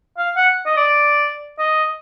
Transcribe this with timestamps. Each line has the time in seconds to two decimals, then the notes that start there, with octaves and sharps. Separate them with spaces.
0.18 F5
0.36 F#5
0.66 D#5
0.77 D5
1.58 D#5